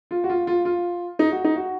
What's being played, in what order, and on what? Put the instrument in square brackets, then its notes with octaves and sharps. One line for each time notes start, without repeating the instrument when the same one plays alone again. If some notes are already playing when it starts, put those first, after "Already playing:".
[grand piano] F4
F#4
F4
F4
F4
D#4
F#4
D#4
F#4